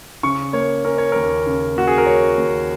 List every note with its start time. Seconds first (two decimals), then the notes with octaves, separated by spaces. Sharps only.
0.23 C#3 C#6
0.53 A#3 C#5
0.85 C#4 A#4
0.98 C#5
1.12 D#2 A#4
1.46 C#3
1.76 A#3 F#4
1.87 G#4
1.98 A#4
2.06 C#4 C#5
2.37 D#2